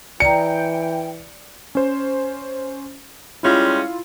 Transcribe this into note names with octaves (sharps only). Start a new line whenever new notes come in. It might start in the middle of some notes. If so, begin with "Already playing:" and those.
E3 D5 G5 A#5 C#7
C#4 C5
G3 G#3 C#4 E4 F4